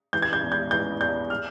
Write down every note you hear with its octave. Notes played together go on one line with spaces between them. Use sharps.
E3 G6
G#6
G6
E2
G6
E3 G6
E2 G6
F6